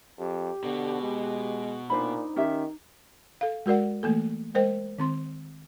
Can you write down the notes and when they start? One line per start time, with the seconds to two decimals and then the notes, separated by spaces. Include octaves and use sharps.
0.19 F2 G4
0.64 B2 D3 B3
1.02 G#3
1.90 A#2 D4 D#4 C5 B5
2.36 D#3 C#4 G4 E5
3.41 A4 F5
3.66 G#3 F#4 A#4 D5 F#5
4.03 E3 A3 A#3 A4
4.54 G#3 A#4 C5 D#5 G5
4.98 D#3 C4 C6